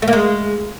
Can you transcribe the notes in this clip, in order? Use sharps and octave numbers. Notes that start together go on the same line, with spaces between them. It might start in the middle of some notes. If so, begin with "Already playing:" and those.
A3
A#3
G#3